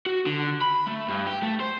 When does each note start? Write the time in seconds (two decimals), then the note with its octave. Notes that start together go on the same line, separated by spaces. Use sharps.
0.06 F#4
0.26 D3
0.61 B5
0.87 A3
1.08 G2
1.26 G4
1.42 A3
1.60 C5